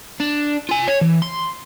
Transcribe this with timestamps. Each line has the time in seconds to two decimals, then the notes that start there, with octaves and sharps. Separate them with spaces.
0.20 D4
0.69 F4 G#5
0.88 C#5
1.01 E3
1.22 C6